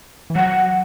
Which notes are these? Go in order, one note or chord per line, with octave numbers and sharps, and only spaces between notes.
E3
F#3 F#5